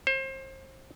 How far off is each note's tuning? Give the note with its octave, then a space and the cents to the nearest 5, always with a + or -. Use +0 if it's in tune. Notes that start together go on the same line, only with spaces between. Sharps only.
C5 +35